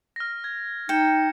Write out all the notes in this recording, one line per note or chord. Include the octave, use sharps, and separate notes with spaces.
F6 A#6
G#6
D#4 G5 C#7 E7